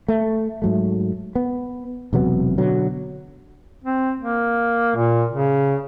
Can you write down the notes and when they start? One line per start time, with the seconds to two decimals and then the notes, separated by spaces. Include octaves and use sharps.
0.08 A3
0.62 G#2 F#3 A3
1.35 B3
2.13 E1 C3 F#3 B3
2.58 B2 D3 F#3
3.84 C4
4.20 A#3
4.96 A#2
5.30 C#3